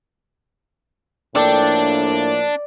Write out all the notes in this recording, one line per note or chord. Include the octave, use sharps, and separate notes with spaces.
A2 F3 A#3 D4 A4 D5 G5